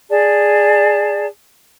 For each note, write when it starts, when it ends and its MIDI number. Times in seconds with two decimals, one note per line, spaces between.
0.09 1.25 68
0.09 1.25 74
0.09 1.25 81